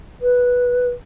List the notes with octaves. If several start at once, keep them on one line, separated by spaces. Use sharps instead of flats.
B4